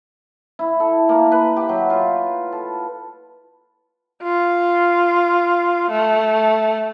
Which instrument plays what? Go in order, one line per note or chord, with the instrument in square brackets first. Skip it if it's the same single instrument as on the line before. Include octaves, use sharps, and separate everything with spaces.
[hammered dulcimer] E4
A4
A#3
B4
G4
F#3
F4
A4
[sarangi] F4
A3